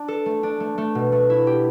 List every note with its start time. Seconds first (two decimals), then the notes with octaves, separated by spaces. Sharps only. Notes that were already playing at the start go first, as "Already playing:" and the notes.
Already playing: D4
0.08 A4
0.26 A3
0.43 D4
0.60 A3
0.78 A3
0.95 B2
1.12 A3
1.30 E4
1.47 G4